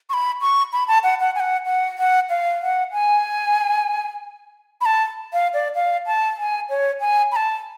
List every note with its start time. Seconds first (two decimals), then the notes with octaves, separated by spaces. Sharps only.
0.09 C#6
0.13 B5
0.41 C#6
0.73 B5
0.88 A5
1.03 F#5
1.20 F#5
1.35 G#5
1.40 F#5
1.66 F#5
1.98 F#5
2.30 F5
2.62 F#5
2.92 G#5
4.81 B5
4.86 A5
5.33 F5
5.54 D5
5.75 F5
6.06 A5
6.38 G#5
6.70 C#5
7.00 G#5
7.32 B5
7.36 A5